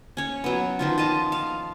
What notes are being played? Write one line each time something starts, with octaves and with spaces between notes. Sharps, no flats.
C#4 C#5
F#3 B3
D#3 F3 F4
F4 D#5 A5 A#5
F5